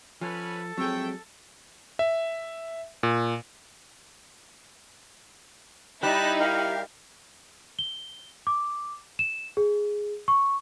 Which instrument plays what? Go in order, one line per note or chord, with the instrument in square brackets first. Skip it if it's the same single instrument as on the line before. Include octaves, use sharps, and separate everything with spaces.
[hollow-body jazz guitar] F3 [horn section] C#4 B4 [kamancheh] A4
[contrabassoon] F2 [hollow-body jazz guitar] F#3 G#3 G#4 [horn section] C#5 E5 G5
[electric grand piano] E5
A#2
[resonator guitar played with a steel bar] G3 [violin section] D#4 E4 [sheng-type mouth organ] A5 F#6
[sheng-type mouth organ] G4 A#4 F5
[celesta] G7
D6
E7
G#4
C#6